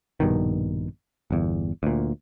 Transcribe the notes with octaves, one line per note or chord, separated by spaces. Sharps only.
A#1 G2 B2 D#3
G1 E2
D2 A#2